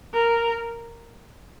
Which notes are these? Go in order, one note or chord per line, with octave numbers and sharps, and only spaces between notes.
A#4